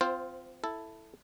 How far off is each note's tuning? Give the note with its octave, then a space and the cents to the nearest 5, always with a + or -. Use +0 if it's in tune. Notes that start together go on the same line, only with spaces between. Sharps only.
C4 -20 F4 +0 C5 +5
E4 +0 A4 +0